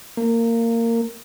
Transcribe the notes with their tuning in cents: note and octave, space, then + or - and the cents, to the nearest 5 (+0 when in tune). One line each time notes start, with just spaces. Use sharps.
A#3 -20